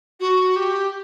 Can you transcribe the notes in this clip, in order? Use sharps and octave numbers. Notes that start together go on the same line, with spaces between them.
F#4
G4